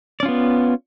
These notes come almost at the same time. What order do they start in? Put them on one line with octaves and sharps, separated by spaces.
D5 C#4 F4 B3